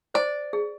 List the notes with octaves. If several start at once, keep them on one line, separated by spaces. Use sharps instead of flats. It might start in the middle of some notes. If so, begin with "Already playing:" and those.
C5 D5
G#4